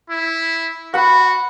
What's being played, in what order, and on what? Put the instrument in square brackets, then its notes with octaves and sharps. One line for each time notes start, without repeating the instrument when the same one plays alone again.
[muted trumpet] E4
[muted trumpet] F#4 [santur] F#5 B5